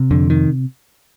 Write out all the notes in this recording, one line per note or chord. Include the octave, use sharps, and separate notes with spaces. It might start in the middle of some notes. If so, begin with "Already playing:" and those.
Already playing: C3
F2 D3
D#3